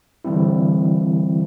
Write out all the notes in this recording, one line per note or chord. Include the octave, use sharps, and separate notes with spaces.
D3 E3 G3 C4 E4